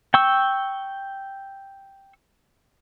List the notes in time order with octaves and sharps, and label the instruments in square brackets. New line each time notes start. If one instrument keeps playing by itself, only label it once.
[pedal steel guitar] G5 C#6 E6